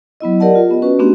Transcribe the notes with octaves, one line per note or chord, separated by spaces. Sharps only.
F#3 B3 E4 D#5
G4 A#4 D5 D#5 F#5 A5
F4
B3 D#5
C#4 F#4 B4
A3 B3 C4 D4 F#4 G4